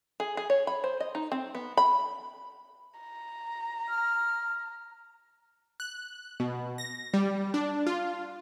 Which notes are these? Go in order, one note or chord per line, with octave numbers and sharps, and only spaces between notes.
G#4
G#4
C#5
B5
C5
D#5
D#4
C4
B3
B5
A#5
F6
F#6
B2
A#6
G3
D4
F4